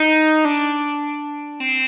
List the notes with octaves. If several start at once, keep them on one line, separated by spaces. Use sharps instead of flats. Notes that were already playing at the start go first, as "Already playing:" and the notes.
Already playing: D#4
D4
C4